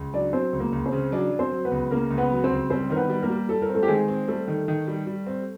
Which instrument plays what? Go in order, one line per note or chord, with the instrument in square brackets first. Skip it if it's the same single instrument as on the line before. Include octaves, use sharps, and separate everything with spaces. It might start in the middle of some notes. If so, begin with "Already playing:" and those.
Already playing: [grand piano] C#2
[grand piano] F#3 [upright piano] D4 D5
[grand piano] F#3 [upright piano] C4 C5
[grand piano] C#2
[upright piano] A#3 A#4
[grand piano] C#2
[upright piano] C4 C5
[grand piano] C#3
[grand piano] F#3 [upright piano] D4 D5
[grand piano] F#3
[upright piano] C4 C5
[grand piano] F#3
[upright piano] B3 B4
[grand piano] C#2
[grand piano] C#3 [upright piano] A#3 A#4
[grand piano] C#2
[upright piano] B3 B4
[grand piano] F#3
[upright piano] C4 C5
[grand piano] C#2
[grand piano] G3 [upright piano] C4 C5
[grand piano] D#3 [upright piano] A#4
[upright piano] B3 B4
[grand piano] G3
[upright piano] A#3 A#4
[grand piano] G3
[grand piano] G3 [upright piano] A4
[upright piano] A#4
[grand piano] C4
[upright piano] A3 A4
G4
[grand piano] D#3 [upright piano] G#3 G#4
[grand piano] C4
[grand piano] G3 [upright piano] A3 A4
[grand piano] D#3
D#3
G3
G3
C4